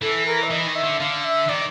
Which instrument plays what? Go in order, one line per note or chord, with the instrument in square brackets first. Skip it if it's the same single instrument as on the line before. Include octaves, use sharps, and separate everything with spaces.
[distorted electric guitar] E3 [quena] A4
[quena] A#4
E5
[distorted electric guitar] E3 [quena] D#5
[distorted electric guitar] D#3
[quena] E5
[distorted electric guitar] D3
[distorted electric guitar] D3 [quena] F5
[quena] E5
[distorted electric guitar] D#3 [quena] D5